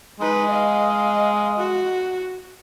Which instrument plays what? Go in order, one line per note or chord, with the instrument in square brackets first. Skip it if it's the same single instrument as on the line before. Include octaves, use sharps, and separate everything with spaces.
[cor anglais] G#3 [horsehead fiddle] D#4 B4
[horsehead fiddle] D#5 F5
F#4